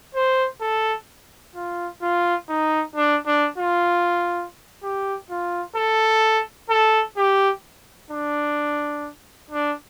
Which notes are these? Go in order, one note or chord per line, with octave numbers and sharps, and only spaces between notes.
C5
A4
F4
F4
D#4
D4
D4
F4
G4
F4
A4
A4
G4
D4
D4